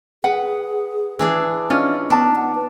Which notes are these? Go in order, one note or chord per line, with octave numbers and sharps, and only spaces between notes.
G#4 B4 F#5
E3 D4 G#4
C#4 D4 F4 D#5
B3 D4 D#4 A5
F#5
B4